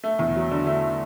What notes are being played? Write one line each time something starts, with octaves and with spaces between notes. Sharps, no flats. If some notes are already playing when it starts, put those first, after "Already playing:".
A3
E2
F#3
D3
A3